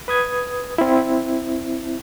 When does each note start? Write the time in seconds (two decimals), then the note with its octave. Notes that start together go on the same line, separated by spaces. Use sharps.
0.08 B4 D#6 G#6
0.78 C4 E4